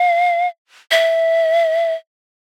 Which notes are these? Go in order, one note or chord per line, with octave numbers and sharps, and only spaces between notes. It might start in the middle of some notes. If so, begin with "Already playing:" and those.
Already playing: F5
E5